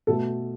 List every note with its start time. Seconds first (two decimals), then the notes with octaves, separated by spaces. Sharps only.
0.07 B2 A3 A4